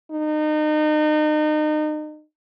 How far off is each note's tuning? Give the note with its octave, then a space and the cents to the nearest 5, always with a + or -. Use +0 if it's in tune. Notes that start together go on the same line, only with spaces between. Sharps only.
D#4 -30